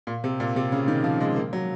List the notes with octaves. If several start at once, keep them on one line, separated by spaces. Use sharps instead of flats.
A#2
C3
A#2
C3
C#3
D#3
F3
G#3
A#3
F#3